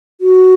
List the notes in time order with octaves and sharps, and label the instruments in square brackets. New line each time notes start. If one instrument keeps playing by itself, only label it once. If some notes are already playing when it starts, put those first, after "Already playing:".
[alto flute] F#4